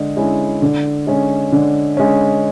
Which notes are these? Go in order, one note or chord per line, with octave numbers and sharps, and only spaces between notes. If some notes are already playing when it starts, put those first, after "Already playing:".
Already playing: D3 G#3
G#3 C#4 E4
D3
G#3 C#4
D3
G#3 C#4